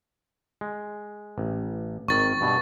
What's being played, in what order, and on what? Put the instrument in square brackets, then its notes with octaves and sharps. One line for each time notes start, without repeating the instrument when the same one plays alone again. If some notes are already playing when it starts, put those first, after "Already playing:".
[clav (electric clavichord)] G#3
A1
[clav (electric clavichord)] G#1 D#3 [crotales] C#6 A6
[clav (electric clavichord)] G2 B2